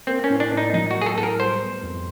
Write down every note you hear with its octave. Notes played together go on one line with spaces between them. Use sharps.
A#3 C4
C#4
A2
D4
A2
D#4
F#3 D#4
F#4
A#3
G#4
A4
A2 A4
A#4
G3 C5
B3
F2